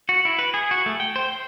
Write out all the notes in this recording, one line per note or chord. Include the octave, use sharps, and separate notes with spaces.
F#4
E4
B4
G#4
F#4
A3
G5
C5
C5